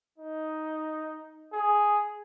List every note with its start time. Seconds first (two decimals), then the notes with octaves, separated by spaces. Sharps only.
0.18 D#4
1.53 G#4